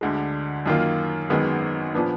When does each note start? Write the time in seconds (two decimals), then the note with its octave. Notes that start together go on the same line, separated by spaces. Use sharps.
0.01 D2 D3 G#3
0.66 F#2 D#3 A#3 F4
1.30 G#1 F#2 D#3 G#3 B3
1.94 A#2 F3 B3 D4